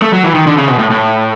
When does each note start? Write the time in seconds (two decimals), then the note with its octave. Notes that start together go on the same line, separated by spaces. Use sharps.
0.02 A3
0.13 F#3
0.24 E3
0.35 D#3
0.47 D3
0.57 C#3
0.68 B2
0.79 A2
0.90 A2